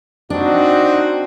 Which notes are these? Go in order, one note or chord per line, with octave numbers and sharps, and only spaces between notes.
C4 D4 D#4 F#4